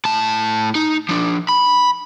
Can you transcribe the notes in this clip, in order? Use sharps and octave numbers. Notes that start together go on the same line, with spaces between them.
A2 A5
D#4
F3 D4
B5